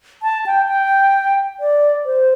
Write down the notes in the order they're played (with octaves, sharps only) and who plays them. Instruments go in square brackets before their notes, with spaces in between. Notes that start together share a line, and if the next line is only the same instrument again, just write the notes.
[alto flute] A5
G5
G5
D5
C5